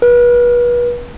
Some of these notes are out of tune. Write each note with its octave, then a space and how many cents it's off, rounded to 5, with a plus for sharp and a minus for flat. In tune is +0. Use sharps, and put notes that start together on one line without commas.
B4 -35